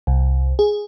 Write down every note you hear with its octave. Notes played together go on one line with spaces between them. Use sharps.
C2
G#4